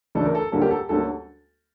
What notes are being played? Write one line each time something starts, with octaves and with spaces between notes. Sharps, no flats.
D2 C#3 E3 A3 D4 A4
A#4
A4
D2 D3 G3 A#3 C#4 A4
G4 A#4
A4
D2 D3 G3 A#3 C#4 A4